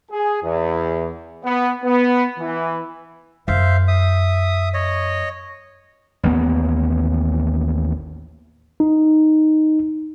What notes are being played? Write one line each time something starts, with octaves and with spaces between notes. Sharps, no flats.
G#4
E2
B3
B3
E3
F#2 C5 E5 F5
E5 D#6
C#5 D#5
A1 D#2 A#3 B3
D#4